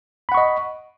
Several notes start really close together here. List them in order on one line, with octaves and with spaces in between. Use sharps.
B5 F#5 C#6 D#5